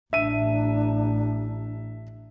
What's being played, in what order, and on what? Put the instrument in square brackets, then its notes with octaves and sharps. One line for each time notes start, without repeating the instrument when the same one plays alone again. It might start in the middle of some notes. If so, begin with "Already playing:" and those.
[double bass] A1 [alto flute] D4 [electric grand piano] E5 D#7